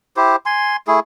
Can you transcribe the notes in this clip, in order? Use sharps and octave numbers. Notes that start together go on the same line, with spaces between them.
E4 G4 C5
G#5 C6
A3 E4 G#4